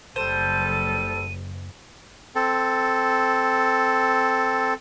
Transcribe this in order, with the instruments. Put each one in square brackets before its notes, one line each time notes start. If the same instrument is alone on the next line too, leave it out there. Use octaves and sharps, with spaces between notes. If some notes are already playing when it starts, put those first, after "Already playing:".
[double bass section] F#1 [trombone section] G3 A4 [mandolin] C5 [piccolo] D#7
[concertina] C4 A4